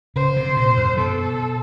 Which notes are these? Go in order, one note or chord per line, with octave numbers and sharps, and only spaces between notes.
C#3 C5
C3
A#2
F#2
B2 A4